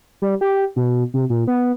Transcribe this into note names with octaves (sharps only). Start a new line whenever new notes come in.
G3
G4
B2
C3
A#2
B3